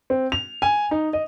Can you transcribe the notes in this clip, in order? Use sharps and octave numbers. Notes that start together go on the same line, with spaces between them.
C4
F7
G#5
D#4
D#5